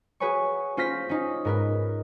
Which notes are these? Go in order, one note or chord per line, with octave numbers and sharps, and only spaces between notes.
F#4 G#4 B4 C#5 G#5 C#6
C#4 F4 C5 F6 A#6 B6
C#4 D#4
G#2 A#4 B4